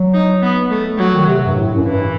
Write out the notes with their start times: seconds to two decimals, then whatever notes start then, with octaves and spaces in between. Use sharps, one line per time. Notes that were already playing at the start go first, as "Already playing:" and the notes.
Already playing: F#3
0.14 D#4
0.42 B3
0.70 A3
0.98 F#3
1.14 D#3
1.26 C3
1.46 G2
1.55 A2
1.75 F#2
1.83 G2 E3